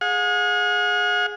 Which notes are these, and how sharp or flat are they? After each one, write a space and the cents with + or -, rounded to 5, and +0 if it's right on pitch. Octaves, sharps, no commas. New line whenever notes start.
G#4 +0 F#5 -45